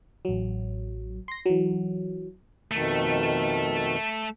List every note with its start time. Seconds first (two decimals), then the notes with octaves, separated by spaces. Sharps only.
0.25 A1 F#3
1.28 C6 A#6
1.46 E3 F#3
2.71 F2 B2 D#3 A3